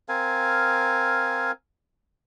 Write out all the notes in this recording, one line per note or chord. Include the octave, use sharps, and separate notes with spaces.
C4 A#4 F5 G#5